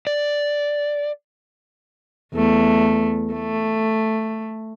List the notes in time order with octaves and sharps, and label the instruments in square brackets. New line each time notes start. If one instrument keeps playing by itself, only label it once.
[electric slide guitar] D5
[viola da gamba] E2 A3
A3